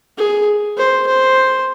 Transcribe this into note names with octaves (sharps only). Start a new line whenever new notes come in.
G#4
C5
C5